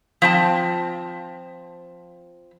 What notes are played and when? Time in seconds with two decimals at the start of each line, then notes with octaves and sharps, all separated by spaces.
0.22 F3 C4 A5